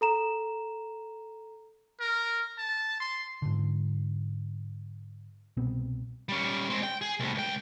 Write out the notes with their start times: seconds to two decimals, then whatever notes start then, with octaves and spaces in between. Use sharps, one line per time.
0.01 A4 A#5 E7
2.00 A#4
2.58 A5
3.00 C6
3.42 G#2 D3
5.57 C2 B2 B3 C4
6.29 G3 C#4
6.70 G#3 C4
6.83 G5
7.01 G#4
7.20 C2 A2
7.35 C#2 G5